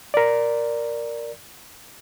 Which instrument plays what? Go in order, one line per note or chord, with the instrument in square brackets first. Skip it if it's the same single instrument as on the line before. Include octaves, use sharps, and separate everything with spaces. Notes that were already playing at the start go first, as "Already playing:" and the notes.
[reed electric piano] A#4 D5